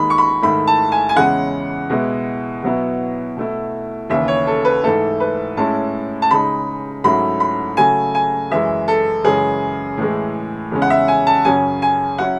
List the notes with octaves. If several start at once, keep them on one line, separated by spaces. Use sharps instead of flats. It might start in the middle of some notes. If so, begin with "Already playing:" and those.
Already playing: D#2 D#3 G#3 D#4 B5
C#6
B5
G#2 D#3 A3 E4 B5
A5
G#5
G#5
E2 C#3 G#3 C#4 E4 F#5
B2 G#3 B3 E4
B2 F#3 B3 E4
B2 A3 E4
D#2 C#3 E3 E5
C#5
A4
B4
G#2 E3 A3 E4 A4
B4
A2 G#3 C#4 E4 A5
A5
C#3 G#3 D#4 B5
G#2 F#3 A3 C#4 E4 B5
B5
C#3 F#3 A3 G#5
G#5
F#2 E3 G#3 E5
A4
F#2 C#3 E3 G#3 C#4 G#4
A2 E3 G#3
E2 C#3 G#3 C#4
F#5
E5
G#5
A5
F#2 C#3 F#3 C#4 G#5
G#5
F#3 C#4 E4 F#5